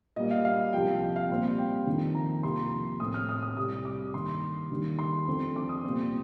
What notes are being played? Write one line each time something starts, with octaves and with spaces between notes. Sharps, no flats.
A#2 G3 A#3 D#5
F5
F5
C2 C3 F3 G5
G5
F5
A#2 G3 C4
G5
F2 D#3 A#3
A#5
C2 C3 F3 A#3 C6
A2 A3 C4 D#6
F6
D#6
D#6
C2 C3 G3 D#6
D6
G2 D#3 A#3 C6
D#2 D#3 G3
C6
F2 D3 A3 C4
D6
D#6
C2 A#2 G3 C4